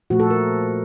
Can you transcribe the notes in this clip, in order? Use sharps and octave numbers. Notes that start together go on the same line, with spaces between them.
A#2 F3 A3 F#4
A4
A#4